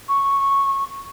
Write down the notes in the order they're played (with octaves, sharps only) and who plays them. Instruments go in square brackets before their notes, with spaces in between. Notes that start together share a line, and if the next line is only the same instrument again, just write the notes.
[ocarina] C#6